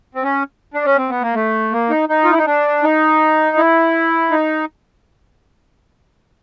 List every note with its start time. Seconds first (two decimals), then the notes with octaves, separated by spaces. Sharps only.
0.15 C4
0.24 C#4
0.74 D4
0.85 C#4
0.97 C4
1.10 B3
1.22 A#3
1.34 A3
1.72 A#3
1.90 D#4
2.09 D#4
2.24 F4
2.32 E4
2.38 D#4
2.46 D4
2.83 D#4
3.57 E4
4.31 D#4